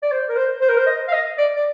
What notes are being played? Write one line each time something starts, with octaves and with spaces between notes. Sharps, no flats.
D5
C5
A#4
C5
C5
A#4
C5
D#5
F5
D#5
D5
D5